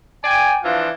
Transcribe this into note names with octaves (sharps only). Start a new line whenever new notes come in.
D5 G5 G#5
E3 F3 D4 F4